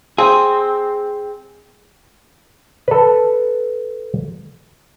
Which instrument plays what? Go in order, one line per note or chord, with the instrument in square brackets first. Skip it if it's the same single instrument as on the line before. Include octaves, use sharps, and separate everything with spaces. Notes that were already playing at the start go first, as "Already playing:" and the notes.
[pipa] C4 [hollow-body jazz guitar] G#4
[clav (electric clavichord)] A4 B4